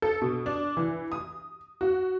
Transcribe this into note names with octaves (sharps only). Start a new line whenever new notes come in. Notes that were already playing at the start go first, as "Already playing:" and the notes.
A4
B2
D4
E3
D#6
F#4